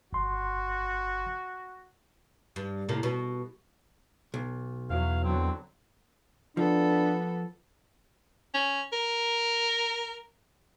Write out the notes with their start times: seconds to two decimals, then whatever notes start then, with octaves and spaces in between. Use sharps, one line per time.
0.13 G1 F#4 C6
2.56 G2
2.89 A2 C3 A#3
3.03 B2
4.34 B1
4.90 E2 F#3 F5
5.24 D3 F#3 C4
6.57 F3 B3 D4 A4
8.54 C#4
8.93 A#4